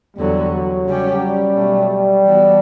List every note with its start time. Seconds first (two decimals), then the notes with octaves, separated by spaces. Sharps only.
0.16 E2 D3 F#3 G3
0.52 F#3
0.87 C#3 G3 C#4 G4
1.22 G3
1.57 B2 F#3 A3
1.91 G3
2.26 E3 B3 F#4 A4